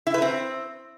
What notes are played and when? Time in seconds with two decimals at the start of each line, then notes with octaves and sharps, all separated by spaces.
0.07 E4
0.14 B4
0.22 C4